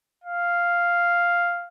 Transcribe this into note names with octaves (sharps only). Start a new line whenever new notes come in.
F5